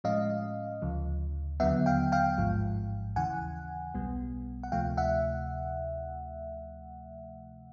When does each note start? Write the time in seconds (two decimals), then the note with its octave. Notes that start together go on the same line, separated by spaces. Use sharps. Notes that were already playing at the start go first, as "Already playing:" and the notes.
0.04 A2 F3 G#3 C#4 D#5 F5
0.82 D2 C#3 F3
1.60 D#2 D3 F#3 B3 E5 F#5
1.86 F5 G5
2.12 F5 G5
2.38 A1 G#2 F3
3.16 D#2 C#3 E3 F#5 G#5
3.94 B1 B2 G3 B3
4.63 F#5
4.72 D2 C3 F3 A3 F5 G5
4.97 E5 F#5